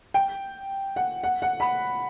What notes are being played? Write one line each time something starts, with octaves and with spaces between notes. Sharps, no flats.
G5
F#5
F#5
F#5
B5